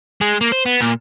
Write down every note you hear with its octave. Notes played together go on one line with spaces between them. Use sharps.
G#3
A#3
C5
B3
A#2